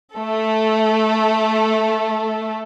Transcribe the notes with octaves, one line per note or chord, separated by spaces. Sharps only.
A3 A4